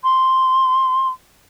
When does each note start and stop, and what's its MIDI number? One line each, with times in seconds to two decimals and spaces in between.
0.03 1.08 84